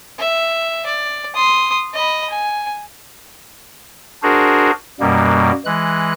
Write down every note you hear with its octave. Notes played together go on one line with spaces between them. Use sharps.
E5
D5
C6 D#6
D#5 B5
G#5
D4 F#4 G#4 A#4 C5
F#2 B2 G3 A#3
E3 G#3 F#6